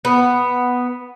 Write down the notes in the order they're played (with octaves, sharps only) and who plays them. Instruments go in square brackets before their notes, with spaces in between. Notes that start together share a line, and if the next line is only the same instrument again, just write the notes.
[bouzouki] B3